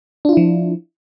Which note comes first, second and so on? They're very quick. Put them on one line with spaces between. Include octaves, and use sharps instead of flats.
D4 F4 E4 F3